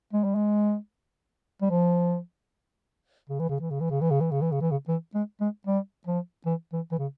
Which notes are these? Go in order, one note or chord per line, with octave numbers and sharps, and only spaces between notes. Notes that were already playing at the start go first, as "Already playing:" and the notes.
G#3
G3
G#3
G3
F3
C#3
E3
C#3
E3
C#3
E3
C#3
E3
C#3
E3
C#3
E3
C#3
E3
C#3
E3
G#3
G#3
G3
F3
E3
E3
E3
C#3